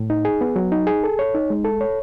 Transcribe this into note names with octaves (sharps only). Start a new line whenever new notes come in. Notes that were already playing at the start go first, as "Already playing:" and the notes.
Already playing: A2
D#4
G#4
B3
F#3
D#4
G#4
A4
C#5
D#4
G#3
A4
C#5